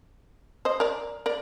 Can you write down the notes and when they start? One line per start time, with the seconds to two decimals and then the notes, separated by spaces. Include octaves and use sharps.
0.65 C5 D#5
0.80 A#4 D5
1.26 A#4 D5